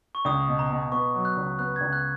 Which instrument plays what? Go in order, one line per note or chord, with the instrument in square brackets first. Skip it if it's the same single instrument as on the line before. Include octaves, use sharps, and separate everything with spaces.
[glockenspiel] C#6
[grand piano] C#2 [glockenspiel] D#6
[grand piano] B2
[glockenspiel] A#5
[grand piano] B2
[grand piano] B3 [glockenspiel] C#6
[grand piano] F#3
[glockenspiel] F#6
[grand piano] C#2
[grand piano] B3 [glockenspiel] F#6
[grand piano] C#2 [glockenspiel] G#6
[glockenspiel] F#6